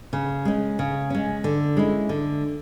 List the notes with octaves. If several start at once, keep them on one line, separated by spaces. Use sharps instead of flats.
C#3
G#3 C#4
C#3
G#3 C#4
D3
G#3 C#4 E4
D3